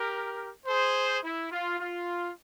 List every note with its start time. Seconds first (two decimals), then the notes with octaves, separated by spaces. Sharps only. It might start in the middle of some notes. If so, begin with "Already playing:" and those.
Already playing: G4 A#4
0.66 G#4 C5
1.23 E4
1.51 F4
1.79 F4